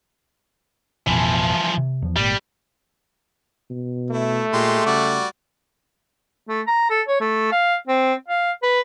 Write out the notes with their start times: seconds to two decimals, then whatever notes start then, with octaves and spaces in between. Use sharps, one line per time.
1.07 A1 F2 B2 E3 F3
1.78 C3
2.02 E2 F3
2.16 G#1 A#2 G3
3.70 B2
4.11 A3 E4
4.53 A#2 G#3 G4 C6
4.86 C#3 G3 F#4 D5
6.48 A3
6.67 A#5
6.90 A4
7.08 C#5
7.20 A3
7.52 F5
7.87 C4
8.28 F5
8.63 B4